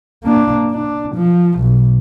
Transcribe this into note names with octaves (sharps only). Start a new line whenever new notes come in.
A#3 D4
D4
F3
B1